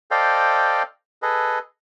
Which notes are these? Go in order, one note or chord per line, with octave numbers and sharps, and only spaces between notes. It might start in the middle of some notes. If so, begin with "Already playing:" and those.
A4 C5 D5 D#5 F5 G5
G#4 A4 B4 D#5